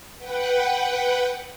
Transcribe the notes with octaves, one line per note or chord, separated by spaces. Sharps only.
B4 F#5 G5